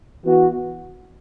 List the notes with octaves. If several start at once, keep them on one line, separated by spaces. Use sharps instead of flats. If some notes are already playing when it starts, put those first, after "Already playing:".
E3 B3 F#4